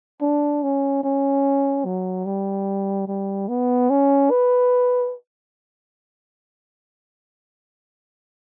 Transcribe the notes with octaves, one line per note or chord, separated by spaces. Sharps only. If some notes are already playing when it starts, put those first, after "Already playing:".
D4
C#4
C#4
F#3
G3
G3
B3
C#4
B4